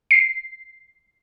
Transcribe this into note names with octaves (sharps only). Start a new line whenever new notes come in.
C7